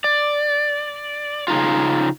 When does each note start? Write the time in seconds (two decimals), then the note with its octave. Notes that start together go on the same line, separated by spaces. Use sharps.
0.04 D5
1.48 C#3 D#4 F4